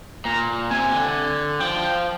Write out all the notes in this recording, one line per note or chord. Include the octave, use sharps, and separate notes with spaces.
A#2 A#5
C3 G#5
D3
F3 G5